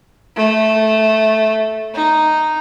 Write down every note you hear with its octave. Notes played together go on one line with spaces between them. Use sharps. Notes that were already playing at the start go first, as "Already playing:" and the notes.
A3
D#4